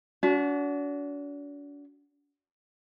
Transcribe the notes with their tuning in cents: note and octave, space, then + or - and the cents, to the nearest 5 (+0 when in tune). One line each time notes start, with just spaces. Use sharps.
D4 -40 F#4 +0